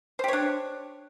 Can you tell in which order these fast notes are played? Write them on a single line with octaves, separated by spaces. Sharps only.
C5 G4 C#5 D4